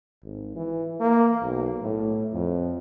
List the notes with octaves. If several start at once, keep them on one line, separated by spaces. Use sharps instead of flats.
G#1
E3
A#3
B1
A2
F2